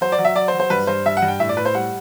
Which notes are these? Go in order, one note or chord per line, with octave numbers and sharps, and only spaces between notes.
F#3 C5
D5
F#3
E5
F#3 D5
C5
F#3
C5
G2 B4
G2 C5
G2 E5
F#5
G2
G5
A2 E5
D5
A2 B4
C5
G3 F#5